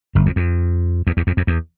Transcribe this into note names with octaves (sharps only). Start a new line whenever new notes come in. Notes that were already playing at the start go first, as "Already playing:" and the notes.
G1 G2
F2
F2
E2
E2
F2
F2
E2